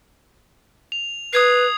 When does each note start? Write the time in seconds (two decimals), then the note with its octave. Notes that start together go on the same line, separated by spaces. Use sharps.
0.92 F7
1.33 B4 D#6 G#6 C7